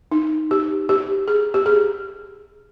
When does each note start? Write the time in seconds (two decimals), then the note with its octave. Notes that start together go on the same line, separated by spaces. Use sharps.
0.12 D#4
0.51 G4
0.89 G4
1.28 G#4
1.54 G4
1.66 G#4